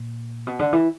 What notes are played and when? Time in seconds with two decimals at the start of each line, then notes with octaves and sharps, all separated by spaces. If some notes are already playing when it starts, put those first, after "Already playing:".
Already playing: A#2
0.47 B2
0.59 D3
0.73 E3